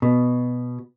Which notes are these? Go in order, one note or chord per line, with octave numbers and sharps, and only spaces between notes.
B2